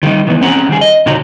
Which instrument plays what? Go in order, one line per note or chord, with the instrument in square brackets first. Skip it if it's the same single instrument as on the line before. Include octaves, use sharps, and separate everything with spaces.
[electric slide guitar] D#3 G3 D#4
D#3 E3 B3
C4 C#4 G#4 F#5 A#5
D#3 G3 G#4
D#5
A#2 C#3 D#4 F#4 A#5